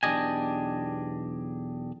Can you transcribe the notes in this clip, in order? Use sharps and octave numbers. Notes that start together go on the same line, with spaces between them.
B1 E2 D4 G4 D#5 G#5